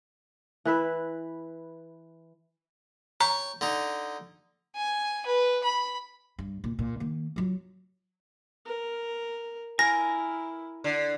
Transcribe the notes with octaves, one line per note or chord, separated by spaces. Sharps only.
E3 B4 E5
C#5 G5 A#5
D3 D#4
G#5
B4
B5
G2
A#2
A#2
D#3 A#3
F#3 F4
A#4
E4 A#4 G#5 A#6
D3